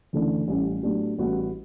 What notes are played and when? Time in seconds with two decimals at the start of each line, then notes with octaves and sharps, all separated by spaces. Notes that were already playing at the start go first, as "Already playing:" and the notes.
0.13 D2 C#3 E3 A3 D4
0.48 A1 A2 G3 C#4
0.83 A2 F#3 B3 D4 G4
1.19 A1 A2 G3 B3 F#4